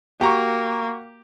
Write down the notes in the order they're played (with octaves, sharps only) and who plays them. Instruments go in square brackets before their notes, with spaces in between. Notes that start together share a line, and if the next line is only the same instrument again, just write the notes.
[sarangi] A#3 [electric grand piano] F#4 A#5 C#6 [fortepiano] G4